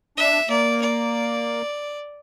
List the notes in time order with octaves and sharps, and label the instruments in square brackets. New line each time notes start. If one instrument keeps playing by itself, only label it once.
[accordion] D4 [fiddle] E5
[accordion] A#3 [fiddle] D5
[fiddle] D5